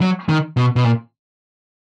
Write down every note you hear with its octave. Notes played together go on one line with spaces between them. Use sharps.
F#3
D#3
B2
B2
A#2